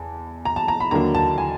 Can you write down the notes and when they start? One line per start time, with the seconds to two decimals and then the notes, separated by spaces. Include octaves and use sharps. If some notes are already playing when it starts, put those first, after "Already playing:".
Already playing: E2 A5
0.45 A#5
0.56 A5
0.68 A#5
0.80 B5
0.91 D#2 D3 F#3 A#3 D4 A#5
1.15 A5
1.38 G#5